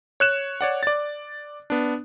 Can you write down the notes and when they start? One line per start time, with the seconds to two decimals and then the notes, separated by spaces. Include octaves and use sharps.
0.20 C#5 F#6 E7
0.61 C#5 D5 F#5
0.83 D5 A6
1.70 B3 D4